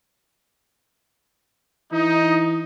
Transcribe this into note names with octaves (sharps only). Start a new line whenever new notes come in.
E3 D#4